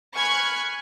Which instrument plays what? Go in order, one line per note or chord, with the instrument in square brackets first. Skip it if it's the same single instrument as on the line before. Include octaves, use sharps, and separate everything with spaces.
[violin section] G#5 B5 C#6 F6 F#6 G#6